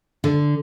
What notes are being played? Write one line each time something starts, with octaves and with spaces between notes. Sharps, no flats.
D3